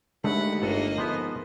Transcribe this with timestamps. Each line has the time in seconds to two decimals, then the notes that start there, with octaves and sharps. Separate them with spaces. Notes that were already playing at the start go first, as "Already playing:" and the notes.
0.24 D#2 D3 G#3 A3 F#5 B5
0.62 G1 A#3 A4 B4 D#5
0.98 G#2 F3 B3 E5